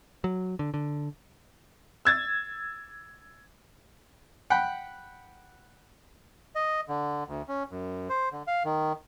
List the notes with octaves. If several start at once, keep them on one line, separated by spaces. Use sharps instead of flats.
F#3
D3
D3
E6 G#6 A6
F#5 G5 B5
D#5
D3
D2
C#4
F#2
C5
D3
F5
D#3